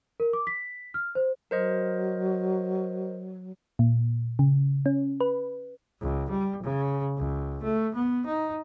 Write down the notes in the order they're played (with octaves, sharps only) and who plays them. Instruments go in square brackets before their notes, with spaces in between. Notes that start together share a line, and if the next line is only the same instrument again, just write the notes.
[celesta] A#4
D6
B6
F6
C5
[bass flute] F#3 [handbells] A#4 C5 D#5
[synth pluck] A#2
C#3
C#4
B4
[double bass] C#2
G3
C#3
C#2
A3
B3
D#4